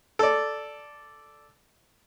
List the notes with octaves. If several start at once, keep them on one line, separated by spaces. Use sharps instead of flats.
A4 D5